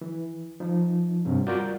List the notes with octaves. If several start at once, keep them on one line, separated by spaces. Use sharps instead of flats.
E3
F3 D#4
G2 C3 C#4
G3 F4 F#4 A#4 D5 G6